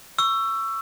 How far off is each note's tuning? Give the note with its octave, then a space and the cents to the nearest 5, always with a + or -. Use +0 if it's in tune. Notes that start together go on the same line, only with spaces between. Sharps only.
C#6 +10 E6 +20